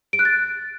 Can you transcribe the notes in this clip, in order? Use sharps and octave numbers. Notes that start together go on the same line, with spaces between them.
D7
F#6
A6